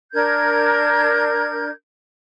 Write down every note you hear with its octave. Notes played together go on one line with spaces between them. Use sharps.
D4 A#4 G6 G#6